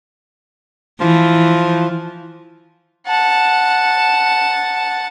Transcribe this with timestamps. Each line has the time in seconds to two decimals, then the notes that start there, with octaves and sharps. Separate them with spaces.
1.00 E3 F3
3.07 F#5 A5